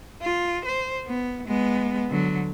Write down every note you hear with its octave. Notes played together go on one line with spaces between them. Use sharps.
F4
C5
B3
G#3 B3
D3 F#3